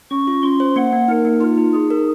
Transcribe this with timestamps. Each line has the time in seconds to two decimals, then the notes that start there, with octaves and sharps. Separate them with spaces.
0.11 C#4 C#6
0.27 F4
0.43 C#4 C6
0.60 C5
0.76 A#3 F#5
0.92 A#3
1.08 D#4 A#4
1.25 A#3
1.41 D#4 F4
1.58 D#4
1.74 D#4 G#4
1.90 A#4